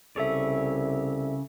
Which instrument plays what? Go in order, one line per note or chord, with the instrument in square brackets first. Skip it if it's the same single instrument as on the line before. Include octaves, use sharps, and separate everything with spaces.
[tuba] C2 [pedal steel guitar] C#3 C#5 D5 [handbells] G#4 A4 E5